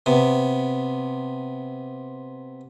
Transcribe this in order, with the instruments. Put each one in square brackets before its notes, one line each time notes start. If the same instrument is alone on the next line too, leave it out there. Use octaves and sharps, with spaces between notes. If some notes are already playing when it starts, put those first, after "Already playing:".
[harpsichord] C3 B3